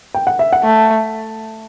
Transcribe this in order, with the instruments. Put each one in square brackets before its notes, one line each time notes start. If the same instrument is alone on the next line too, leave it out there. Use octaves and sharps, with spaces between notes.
[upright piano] G5
F#5
E5
F#5
[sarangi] A3